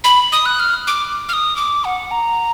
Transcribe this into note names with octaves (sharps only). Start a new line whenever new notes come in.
B5
D#6
F#6
F6
D6
F6
D#6
D6
F#5
A#5